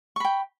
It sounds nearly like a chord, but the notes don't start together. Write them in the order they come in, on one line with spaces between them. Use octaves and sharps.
C#6 B5 G5